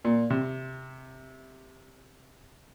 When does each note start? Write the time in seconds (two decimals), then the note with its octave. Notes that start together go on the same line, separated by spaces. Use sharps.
0.05 A#2
0.30 C3